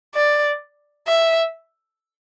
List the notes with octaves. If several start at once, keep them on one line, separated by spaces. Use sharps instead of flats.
D5
E5